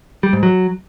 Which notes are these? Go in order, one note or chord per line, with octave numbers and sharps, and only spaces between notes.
G3
G#2
F#3